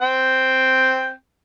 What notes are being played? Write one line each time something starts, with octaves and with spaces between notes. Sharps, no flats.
C4 G5